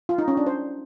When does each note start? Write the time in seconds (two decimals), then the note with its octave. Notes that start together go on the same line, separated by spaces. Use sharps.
0.09 F4
0.18 D#4
0.28 C#4
0.37 D4
0.46 C5